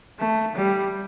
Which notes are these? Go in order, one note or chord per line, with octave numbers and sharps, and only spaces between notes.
A3
G3